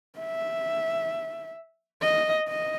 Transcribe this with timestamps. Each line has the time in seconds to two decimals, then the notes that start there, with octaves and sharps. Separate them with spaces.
0.19 E5
2.02 D#5
2.48 D#5